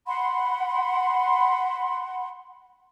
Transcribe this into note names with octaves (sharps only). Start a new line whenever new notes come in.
F#5 B5 C6